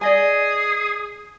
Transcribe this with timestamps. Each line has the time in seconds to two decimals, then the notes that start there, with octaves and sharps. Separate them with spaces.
0.01 G#4 D5 D#5 G#5